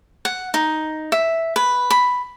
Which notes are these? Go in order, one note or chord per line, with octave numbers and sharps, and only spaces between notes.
F#5
D#4
E5
B4
B5